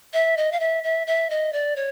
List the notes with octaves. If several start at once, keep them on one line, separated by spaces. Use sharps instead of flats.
E5
D#5
F5
E5
E5
E5
D#5
D5
C#5